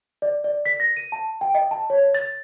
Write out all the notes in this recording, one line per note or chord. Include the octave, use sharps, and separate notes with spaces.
D5
D5
B6
A#6
D#7
A5
G5
D#5
A5
C#5
A6